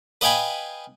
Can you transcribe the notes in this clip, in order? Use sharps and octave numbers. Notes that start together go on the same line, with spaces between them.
B4 D#5 F5 G5 G#5 B5